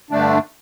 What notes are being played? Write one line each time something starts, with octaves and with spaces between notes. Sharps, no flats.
G2 D3 A3 D4